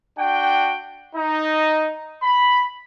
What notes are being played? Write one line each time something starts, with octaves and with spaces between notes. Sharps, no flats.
D4 F#4 G5
D#4
B5